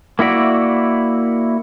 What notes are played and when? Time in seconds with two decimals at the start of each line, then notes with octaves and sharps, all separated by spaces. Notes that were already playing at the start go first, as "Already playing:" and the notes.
0.19 A#3 E4 F#4 D5 E5